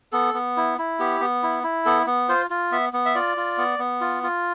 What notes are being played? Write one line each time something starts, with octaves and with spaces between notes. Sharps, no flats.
B3 A4
B3
E4
E4
B3 G4
B3
E4
E4
B3 A4
B3
F4 C5
F4
B3 E5
B3
E5
F4 D5
F4
B3
B3
F4
F4